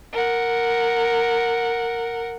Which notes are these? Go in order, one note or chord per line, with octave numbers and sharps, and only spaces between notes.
A#4 F#5